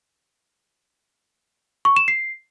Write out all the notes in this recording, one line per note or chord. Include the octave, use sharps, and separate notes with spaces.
C#6
E7
C7